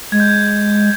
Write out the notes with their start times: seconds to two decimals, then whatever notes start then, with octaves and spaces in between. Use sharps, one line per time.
0.12 G#3 G#6
0.20 G6
0.29 G#6